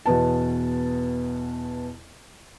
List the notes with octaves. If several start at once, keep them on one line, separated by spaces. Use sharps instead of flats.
E2 B2 B3 A5